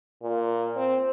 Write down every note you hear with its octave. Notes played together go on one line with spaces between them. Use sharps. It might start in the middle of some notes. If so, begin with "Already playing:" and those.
A#2
C4